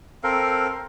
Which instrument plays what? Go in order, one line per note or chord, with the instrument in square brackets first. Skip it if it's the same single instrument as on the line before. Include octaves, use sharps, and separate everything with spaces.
[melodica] C4 A4 A#4 F5